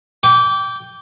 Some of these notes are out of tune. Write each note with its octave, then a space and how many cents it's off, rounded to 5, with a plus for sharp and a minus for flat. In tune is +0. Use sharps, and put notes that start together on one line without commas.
G5 +0 D6 -25